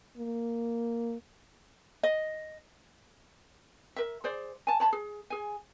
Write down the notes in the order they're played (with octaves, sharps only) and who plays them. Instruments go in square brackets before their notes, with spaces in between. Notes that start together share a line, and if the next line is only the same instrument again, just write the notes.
[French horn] A#3
[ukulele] D#5
A#4 E5
G#4 C5 D5
G#5 A5
C#5 A5 B5
G#4
G#4 G#5